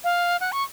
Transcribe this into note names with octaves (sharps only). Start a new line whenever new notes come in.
F5
F#5
C#6